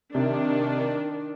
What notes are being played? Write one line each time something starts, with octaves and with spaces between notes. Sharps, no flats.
C3 D#3 D4